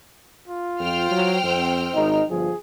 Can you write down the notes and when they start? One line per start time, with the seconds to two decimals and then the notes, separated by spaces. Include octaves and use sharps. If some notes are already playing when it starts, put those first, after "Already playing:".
0.48 F4
0.80 F2 C5 G5 F6
1.11 F#3
1.44 F2 C4
1.94 G#1 D#4
2.30 G1 F3 G#4